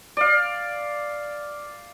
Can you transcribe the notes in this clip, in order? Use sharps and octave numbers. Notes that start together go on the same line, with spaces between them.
D5 F5